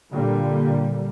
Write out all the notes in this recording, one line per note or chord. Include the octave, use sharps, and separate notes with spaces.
A#2 D3 G3 A#3